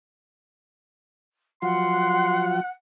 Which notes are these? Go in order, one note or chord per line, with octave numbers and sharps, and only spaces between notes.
F3 F#3 F4 F#5 C6